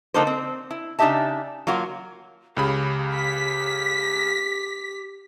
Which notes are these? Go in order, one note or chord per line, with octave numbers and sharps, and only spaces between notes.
D3 F3 A#3 D#4 A4 C5
C4
E4
C#3 D4 D#4 G4 E5 A5
F#3 A#3 F4 F#4
C#2 C#3 G4 B5
B6